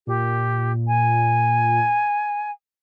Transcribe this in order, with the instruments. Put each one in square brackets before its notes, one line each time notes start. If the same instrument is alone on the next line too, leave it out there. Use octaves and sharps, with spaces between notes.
[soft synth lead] A#2 [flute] G4
[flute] G#5